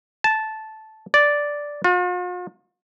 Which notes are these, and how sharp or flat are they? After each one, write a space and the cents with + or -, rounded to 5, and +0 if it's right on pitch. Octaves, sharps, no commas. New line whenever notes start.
A5 -10
D5 -5
F4 +45